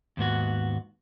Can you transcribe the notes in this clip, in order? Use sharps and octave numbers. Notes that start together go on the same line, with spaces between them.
D#2 G#2 B3 F#4